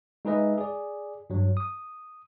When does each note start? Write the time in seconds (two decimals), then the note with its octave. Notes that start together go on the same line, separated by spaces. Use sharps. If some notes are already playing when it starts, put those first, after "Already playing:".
0.25 G#3 D#4 G#4 B4 D#5 E5
0.58 G#4 D5
1.30 G2 F#3
1.57 D#6